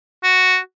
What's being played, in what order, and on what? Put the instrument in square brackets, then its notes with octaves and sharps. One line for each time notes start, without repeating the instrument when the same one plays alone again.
[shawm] F#4